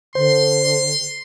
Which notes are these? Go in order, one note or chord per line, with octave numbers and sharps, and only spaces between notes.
D3 C5 C6